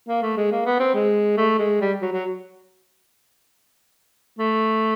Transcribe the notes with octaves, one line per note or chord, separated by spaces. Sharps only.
A#3
A3
G#3
A#3
B3
C4
G#3
A3
G#3
G3
F#3
F#3
A3